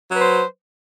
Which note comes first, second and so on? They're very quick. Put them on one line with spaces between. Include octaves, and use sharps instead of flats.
F#3 B4 C5